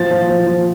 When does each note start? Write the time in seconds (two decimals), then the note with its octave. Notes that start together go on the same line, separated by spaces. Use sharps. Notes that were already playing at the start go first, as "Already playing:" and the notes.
Already playing: F3 A6
0.11 F3
0.30 F3
0.47 F3